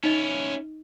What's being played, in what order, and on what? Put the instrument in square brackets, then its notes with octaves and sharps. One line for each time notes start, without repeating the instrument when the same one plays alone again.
[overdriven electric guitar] C#4 E4 [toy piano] D#4 D#5